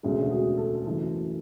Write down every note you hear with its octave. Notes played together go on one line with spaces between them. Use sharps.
E1 D2 C#3 G#3
F#4
G#4
A4
F#1 F#2 E3 A3 A4